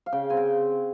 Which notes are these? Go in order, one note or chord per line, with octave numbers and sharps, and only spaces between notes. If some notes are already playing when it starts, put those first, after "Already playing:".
F5
C#3 G5
C4 G#5
G5